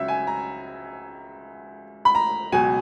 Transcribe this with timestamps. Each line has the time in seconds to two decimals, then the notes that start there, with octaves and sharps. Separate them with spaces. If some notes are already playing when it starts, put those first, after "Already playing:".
Already playing: C#2 C#3 F#3 E5
0.08 G#5
0.27 A#5
2.05 B5
2.15 A#5
2.52 C#2 B2 F#3 G#5